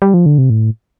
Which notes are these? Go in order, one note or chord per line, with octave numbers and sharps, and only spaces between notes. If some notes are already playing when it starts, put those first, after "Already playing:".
G3
F3
D3
C3
A2